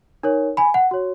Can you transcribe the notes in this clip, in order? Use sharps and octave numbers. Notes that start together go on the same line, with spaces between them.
D#4 A#4 C#5
G#5 B5
F#5
F#4 C#5